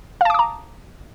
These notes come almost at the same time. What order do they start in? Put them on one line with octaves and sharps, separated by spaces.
F5 A5 D6 D#6 A#5